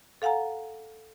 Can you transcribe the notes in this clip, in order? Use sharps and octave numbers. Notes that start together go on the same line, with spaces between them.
A4 F5 F#5 G#5 A#5